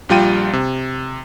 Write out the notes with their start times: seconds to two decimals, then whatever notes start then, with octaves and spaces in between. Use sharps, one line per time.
0.09 A#1 G3 F4 G5 D#7
0.53 C3